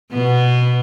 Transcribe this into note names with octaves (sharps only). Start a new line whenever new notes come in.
B2 B3